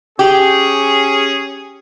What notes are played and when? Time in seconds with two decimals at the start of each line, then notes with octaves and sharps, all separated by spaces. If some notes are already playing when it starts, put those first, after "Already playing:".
0.19 C#4 G4 G#4